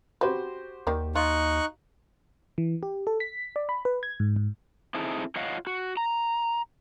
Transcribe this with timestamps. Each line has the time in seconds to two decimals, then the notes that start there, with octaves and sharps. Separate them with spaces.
0.21 F#4 G4 B4 C5
0.87 D#2 D#3 D5
1.15 D#4 F4 C#6 F#6
2.58 E3
2.83 G4
3.07 A4
3.20 B6
3.56 D5
3.69 B5
3.85 B4
4.03 G#6
4.20 G#2
4.36 G#2
4.94 C4 D#4 E4 G#4 A4
5.36 F4 C#5 D#5 F5 F#5
5.67 F#4
5.97 A#5